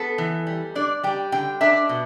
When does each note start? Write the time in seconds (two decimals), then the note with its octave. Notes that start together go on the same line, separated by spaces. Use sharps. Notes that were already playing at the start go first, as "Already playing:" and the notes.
Already playing: B3 A4
0.18 E3
0.47 G3
0.75 D4 D5
1.03 G3 G5
1.32 D3 G5
1.61 D4 E5
1.89 B2